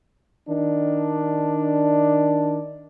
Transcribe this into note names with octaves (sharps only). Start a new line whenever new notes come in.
D#3 D4